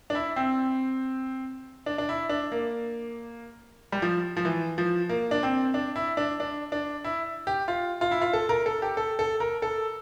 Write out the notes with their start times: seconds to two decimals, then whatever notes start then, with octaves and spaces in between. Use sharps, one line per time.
0.10 D4
0.15 E4
0.36 C4
1.86 D4
1.98 D4
2.09 E4
2.29 D4
2.52 A#3
3.92 G3
4.02 F3
4.37 F3
4.45 E3
4.78 F3
5.09 A#3
5.31 D4
5.43 C4
5.74 D4
5.96 E4
6.17 D4
6.40 D4
6.72 D4
7.04 E4
7.47 G4
7.68 F4
8.01 F4
8.11 E4
8.21 F4
8.33 A4
8.49 A#4
8.66 A4
8.82 G4
8.97 A4
9.19 A4
9.40 A#4
9.62 A4